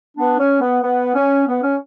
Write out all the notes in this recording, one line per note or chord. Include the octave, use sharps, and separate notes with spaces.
B3 D4
C#4
B3
B3
C#4
B3
C#4